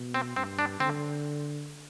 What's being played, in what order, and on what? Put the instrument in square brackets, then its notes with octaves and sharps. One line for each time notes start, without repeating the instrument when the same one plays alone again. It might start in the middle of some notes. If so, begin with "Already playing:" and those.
Already playing: [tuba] B2
[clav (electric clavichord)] C4
[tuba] G2 [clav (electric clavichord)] C4
[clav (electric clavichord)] D4
[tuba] D3 [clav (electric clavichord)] C4